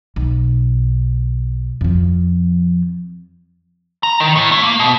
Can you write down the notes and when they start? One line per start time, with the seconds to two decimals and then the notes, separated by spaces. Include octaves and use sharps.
0.16 B1
1.81 F2 F3
4.03 A#5
4.20 D#3
4.36 A2
4.52 A3
4.63 A#3
4.80 B2